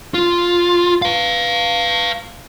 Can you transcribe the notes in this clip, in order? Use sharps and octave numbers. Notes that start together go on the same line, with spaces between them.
F4
B4 F5